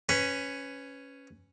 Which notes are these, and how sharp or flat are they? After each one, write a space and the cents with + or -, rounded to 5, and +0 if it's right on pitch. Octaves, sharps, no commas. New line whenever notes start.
C#4 +0 B4 +15